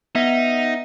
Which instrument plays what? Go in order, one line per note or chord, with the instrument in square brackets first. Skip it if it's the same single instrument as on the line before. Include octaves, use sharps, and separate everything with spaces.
[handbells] B3 E5 [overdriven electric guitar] D#4